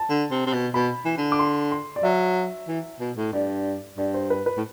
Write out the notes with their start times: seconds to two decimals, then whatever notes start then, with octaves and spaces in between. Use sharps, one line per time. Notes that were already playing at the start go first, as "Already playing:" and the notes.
Already playing: A5
0.09 D3
0.31 C3
0.47 C3
0.53 B2
0.74 B2 B5
1.05 E3
1.17 D3
1.32 D6
1.39 C6
1.71 C6
1.96 D5
2.03 F#3 E5
2.68 E3
3.00 B2
3.17 A2
3.33 G2 D5
3.97 G2 D5
4.14 C5
4.30 B4
4.46 B4
4.57 A2